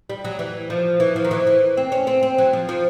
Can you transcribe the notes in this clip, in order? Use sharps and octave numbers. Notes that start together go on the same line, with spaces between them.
G3
F#3
E3
F3
E3
F3
D#3
E3
E3
C4
C#4
C4
C4
F#3
F3
F3